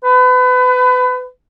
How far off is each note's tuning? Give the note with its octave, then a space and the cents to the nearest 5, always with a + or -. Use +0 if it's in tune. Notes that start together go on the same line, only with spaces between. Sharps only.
B4 +30